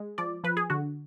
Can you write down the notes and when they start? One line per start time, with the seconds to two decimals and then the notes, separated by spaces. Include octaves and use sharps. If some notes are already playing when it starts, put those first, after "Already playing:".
Already playing: G#3
0.18 F3 D5
0.44 F3 B4
0.57 G#4
0.70 D3 F#4